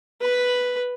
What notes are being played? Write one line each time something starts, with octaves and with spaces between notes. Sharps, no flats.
B4 B5